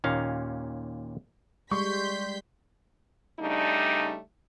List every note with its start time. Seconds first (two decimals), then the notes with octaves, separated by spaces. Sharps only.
0.04 D#2 A#2 C#4 F5 A#5
1.71 G3 G#3 C6 C#6 G6 B6
3.39 C#3 G3 A3 D4 D#4